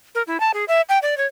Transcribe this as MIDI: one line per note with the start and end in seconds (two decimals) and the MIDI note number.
0.15 0.22 70
0.27 0.40 64
0.40 0.52 81
0.54 0.65 68
0.68 0.81 76
0.89 0.99 79
1.02 1.17 74
1.17 1.26 73